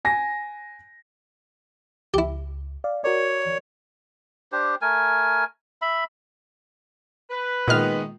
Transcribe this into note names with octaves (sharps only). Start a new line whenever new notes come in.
G#5 A#6
C#2 E4 G4
D5 F5
F#4 A#4 C#5 D5
D4 G4 C5
A3 A#4 G#5
E5 B5
B4
A#2 D#3 G#3 B3 F6